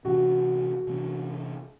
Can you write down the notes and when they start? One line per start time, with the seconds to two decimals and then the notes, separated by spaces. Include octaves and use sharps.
0.05 C3 E3 B3 D4 F#4
0.87 C3 E3 B3 D4